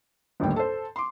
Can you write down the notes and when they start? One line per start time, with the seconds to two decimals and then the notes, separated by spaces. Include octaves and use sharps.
0.40 G1 D#2 A2 G3 A#3 G5
0.56 A4 C5
0.96 C6 D6